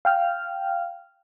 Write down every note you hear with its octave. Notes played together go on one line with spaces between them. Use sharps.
F5 G5 F6